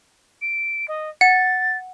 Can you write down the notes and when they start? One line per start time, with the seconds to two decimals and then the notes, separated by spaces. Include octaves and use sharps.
0.41 D7
0.88 D#5
1.21 F#5 A6